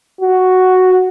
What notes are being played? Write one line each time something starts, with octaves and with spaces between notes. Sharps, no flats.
F#4